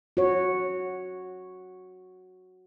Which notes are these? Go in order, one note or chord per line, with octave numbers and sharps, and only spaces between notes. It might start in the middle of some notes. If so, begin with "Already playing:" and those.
F#4 C#5